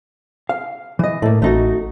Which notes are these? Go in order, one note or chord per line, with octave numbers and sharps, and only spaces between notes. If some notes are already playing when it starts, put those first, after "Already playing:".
F5
E3 D#5
A2 A3 A#3
A1 A3 D#4 F#4